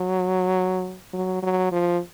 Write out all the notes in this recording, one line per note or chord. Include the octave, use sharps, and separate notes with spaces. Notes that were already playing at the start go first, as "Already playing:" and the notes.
Already playing: F#3
F#3
F#3
F3